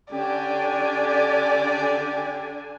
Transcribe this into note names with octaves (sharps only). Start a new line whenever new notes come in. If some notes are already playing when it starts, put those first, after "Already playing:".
D3 C#4 D4 G4 D5 G#5